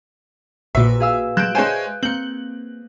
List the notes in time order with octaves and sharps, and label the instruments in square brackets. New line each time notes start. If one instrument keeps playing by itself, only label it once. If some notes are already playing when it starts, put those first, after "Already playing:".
[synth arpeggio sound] A#1 A#2 [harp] F#4 B4 [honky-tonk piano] E5
[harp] G#4 F5 E6
[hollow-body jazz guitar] F#3 G#3 [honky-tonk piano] F#6 G6 D7 [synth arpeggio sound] E7
[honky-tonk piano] G#3 C#5 G#5 [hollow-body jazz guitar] C5 E5 A5 [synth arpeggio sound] G6 E7
[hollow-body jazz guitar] A#3 C4 [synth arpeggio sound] G6 C#7 [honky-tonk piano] F#7